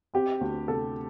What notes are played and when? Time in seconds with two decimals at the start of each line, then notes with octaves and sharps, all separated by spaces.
0.14 C4 G4
0.41 D2
0.68 C3 A4